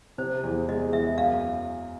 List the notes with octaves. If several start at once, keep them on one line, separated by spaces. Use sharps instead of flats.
C3 C5
E2
G#3 D#5
E2 E5
F#2 F5